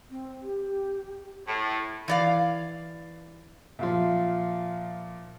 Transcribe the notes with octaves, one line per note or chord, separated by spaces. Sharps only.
C4
G4
A2
E3 D5 F5
A#2 F3 E5 F5 C6